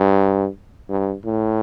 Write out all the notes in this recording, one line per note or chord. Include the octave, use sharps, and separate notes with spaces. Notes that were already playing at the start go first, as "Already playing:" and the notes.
Already playing: G2
G2
A2